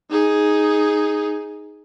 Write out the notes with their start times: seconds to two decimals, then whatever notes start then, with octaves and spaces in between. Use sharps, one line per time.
0.10 D#4 G#4